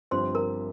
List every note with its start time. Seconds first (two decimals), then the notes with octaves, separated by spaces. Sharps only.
0.11 G1 G2 F3 C4 G4 C5 C6
0.35 A#4 A#5